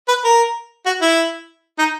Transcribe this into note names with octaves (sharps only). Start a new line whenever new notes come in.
B4
A#4
F#4
E4
D#4